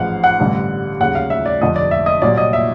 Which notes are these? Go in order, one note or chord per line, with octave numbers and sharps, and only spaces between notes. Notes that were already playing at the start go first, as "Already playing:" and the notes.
Already playing: A1 G#2 F3 G#3 F5 F#5
F#5
A1 G2 D3 G3
D#2 C#3 F#3 F#5
F5
E5
D5
F1 F2 D3 D#5
D5
E5
D#5
C2 A#2 F#3 D5
D#5
E5